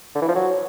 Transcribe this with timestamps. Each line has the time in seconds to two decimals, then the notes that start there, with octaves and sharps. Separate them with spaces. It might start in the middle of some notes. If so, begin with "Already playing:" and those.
0.15 D3
0.22 E3
0.28 F3
0.35 F#3